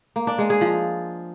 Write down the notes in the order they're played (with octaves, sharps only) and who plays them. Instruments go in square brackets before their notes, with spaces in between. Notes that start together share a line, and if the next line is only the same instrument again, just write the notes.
[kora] A#3
D4
G#3
G#4
F3